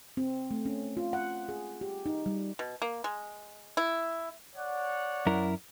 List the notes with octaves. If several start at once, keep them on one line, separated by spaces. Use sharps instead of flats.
C4
A3
C#4
F4
F#5
G#4
G4
D#4
G3
B2
A#3
G#3
E4
C#5 D5 F#5
F#2 E4 A#4